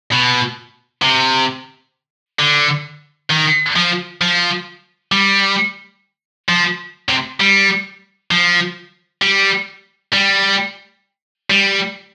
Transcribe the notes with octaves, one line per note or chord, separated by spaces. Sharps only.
B2
C3
D3
D#3
F3
F3
G3
F3
C3
G3
F3
G3
G3
G3